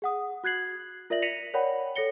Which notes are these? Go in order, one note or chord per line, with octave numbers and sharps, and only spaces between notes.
G#4 F#5 D#6
F#4 F#6 G#6 C7 F#7
F4 A#4 D5 E5 A#6 F#7
A#6 B6 C#7 D#7 F7 F#7
A#4 C#5 D5 F#5 G5 B5
A4 C#5 A#6 C#7 G7